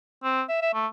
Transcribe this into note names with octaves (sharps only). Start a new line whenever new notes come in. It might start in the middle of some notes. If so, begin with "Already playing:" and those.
C4
E5
E5
A3